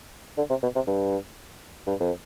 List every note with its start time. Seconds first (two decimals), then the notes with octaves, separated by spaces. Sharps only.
0.37 D3
0.50 C3
0.63 B2
0.75 C3
0.87 G2
1.87 G2
2.00 F2